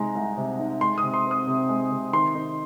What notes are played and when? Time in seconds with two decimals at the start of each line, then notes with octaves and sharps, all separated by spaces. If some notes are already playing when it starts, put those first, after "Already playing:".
Already playing: C3 G#3 D#4 A#5
0.15 C2
0.37 C3
0.59 D#4
0.81 G#3 C6
0.98 D#6
1.03 C3
1.14 C6
1.25 C4
1.31 D#6
1.47 C3
1.69 G#3
1.91 C3
2.13 D#3 C6
2.35 D#4